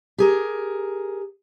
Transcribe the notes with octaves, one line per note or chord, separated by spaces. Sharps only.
G4 G#4 A#4